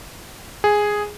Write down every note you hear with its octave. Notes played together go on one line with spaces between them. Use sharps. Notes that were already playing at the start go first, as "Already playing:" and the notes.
G#4